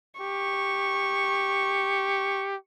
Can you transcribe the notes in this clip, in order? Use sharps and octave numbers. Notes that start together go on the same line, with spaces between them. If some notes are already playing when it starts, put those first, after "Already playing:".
G4 C#6